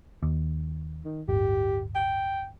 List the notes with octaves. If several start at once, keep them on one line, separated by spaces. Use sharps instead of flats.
D#2
D#3
D1 G1 G4
G5